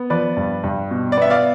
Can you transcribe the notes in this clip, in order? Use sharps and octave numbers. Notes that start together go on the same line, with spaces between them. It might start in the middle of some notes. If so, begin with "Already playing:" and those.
Already playing: B3
F3 B4 D5
G2
G2
B2
D5
B3 E5
D5 F5